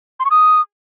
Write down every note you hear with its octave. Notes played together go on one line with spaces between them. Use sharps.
C6
C#6
D#6